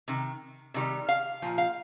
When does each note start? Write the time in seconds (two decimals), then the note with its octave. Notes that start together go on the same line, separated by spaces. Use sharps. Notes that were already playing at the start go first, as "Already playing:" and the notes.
0.08 C3 D#3
0.74 C3 D#3 G3
1.09 F5
1.42 A#2 F3
1.58 F5